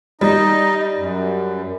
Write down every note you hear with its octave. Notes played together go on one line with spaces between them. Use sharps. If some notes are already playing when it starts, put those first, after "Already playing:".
G3 D#4 D#5
F#2